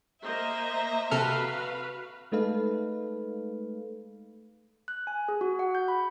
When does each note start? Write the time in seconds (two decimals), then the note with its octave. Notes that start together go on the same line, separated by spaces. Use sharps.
0.24 A#3 C5 D#5 E5 A#5
1.11 C3 F#4 A4 B4 F5 F6
2.32 G#3 A3 D#4 A4 B4 F5
4.88 F#6
5.07 G#5
5.28 G#4
5.41 F#4
5.59 F#5
5.75 G6
5.88 B5